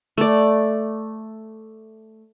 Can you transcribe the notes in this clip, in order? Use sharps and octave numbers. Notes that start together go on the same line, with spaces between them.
A3 D5